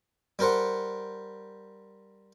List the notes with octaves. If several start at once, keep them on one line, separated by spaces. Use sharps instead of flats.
G3 G4 A#4 C5 F#5